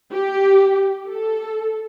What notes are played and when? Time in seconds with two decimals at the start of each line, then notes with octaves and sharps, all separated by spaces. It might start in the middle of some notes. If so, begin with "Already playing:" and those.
0.12 G4
1.09 A4